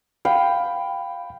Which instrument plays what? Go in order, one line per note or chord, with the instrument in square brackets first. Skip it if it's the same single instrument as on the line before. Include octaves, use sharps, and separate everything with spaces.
[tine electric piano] F5 B5 [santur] G5